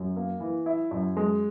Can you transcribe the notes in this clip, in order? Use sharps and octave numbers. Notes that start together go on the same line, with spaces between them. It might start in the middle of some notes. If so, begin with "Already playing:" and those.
Already playing: F#2
A#3
E3
E4
F#2
G#3